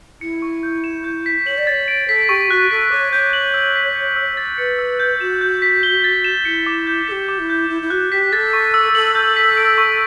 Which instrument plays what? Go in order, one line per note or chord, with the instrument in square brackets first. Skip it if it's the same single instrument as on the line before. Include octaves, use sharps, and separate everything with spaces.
[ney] E4 [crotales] C#7
[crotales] C#6
G6
E7
G6
B6
[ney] C#5 [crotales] F#7
[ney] D5
[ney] C#5 [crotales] A6
[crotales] D7
[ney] A4 [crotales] B6
[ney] G4 [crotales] C#6
[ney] F#4 [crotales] F#6
[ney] A4 [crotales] B6
[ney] C#5 [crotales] D6
[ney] C#5 [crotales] G6
[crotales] F#7
E6
B6
C#7
E6
A6
[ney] B4 [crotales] C#7
[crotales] E6
G6
[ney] F#4 [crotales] E7
[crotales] G6
B6
G7
A6
E7
[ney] E4 [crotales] C#7
[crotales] D6
G6
[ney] A4 [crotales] B6
[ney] G4
[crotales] D6
[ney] E4
[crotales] G6
[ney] E4 [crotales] E7
[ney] E4
[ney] F#4 [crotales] F#6
[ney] G4 [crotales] B6
[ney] A4 [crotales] A6
[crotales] C#6
E6
[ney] A4 [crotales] F#7
[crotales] G6
B6
D7
C#6